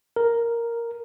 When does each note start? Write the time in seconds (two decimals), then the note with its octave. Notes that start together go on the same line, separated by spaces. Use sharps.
0.16 A#4